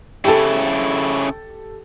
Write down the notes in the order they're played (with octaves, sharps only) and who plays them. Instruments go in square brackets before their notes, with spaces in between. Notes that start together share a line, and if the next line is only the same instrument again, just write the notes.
[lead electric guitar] C#3 E4 [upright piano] G4 A4